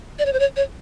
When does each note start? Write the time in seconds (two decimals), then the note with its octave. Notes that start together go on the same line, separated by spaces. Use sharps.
0.19 D5
0.26 C#5
0.33 C5
0.39 C#5
0.56 C#5